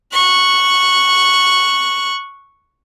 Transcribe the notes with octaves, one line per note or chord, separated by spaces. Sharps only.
C#6 F#6